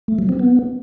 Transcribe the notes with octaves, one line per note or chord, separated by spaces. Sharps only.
A3
F#3
C4
B3